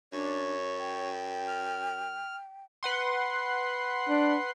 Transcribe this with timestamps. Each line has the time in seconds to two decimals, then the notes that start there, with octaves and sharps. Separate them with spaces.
0.13 F#2 D4 C#5
0.79 G5
1.47 F6
2.83 B4 F#5 C6
4.09 D4